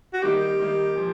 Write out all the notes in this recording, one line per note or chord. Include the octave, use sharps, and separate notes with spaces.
F#4
D#3 G3 A#3 D#4 G4
D#3 G3 A#3 D#4
A#2 F3